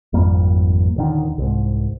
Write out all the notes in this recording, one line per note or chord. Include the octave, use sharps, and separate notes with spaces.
G#1 F2 G3 A#3
D#1 D3 D#3
C2 G#2